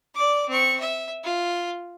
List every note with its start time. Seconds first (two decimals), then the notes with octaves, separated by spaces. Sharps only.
0.15 D5 D6
0.49 C4 C#6
0.80 E5
1.24 F4